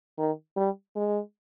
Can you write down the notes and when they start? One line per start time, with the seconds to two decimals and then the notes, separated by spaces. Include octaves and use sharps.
0.18 D#3
0.57 G3
0.96 G#3